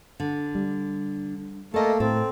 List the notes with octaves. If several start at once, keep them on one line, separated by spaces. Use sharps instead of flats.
D3
G3
A3 A#3 A4 D#5
A2 C4 A4